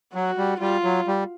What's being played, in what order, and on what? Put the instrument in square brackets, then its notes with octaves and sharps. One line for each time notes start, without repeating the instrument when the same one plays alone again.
[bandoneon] F#3 [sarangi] F#4
[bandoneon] G3
[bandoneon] G3 [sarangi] F4
[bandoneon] F#3
G3